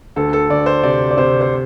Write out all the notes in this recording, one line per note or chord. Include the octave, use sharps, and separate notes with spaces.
D2 A4
A4
D2 D5
C5
C3 D5
D5
C3 C5
C5